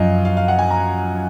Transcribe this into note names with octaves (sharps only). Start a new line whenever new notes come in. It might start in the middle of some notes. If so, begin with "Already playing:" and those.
Already playing: F#2 F3 D#5 F5
F5
F5
F#5
G#5
A#5